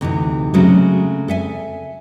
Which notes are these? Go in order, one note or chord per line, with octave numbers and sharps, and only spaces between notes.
D2 C3 E3 D#4
C#3 F#3 G#3 A3 C4 C#4
A4 E5 G#5